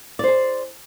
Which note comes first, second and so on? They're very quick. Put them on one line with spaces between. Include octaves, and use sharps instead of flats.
D5 C5 G#4